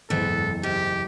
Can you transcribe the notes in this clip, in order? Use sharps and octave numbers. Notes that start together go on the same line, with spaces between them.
F#1 E2 G#2 B3 A4
G#2 G4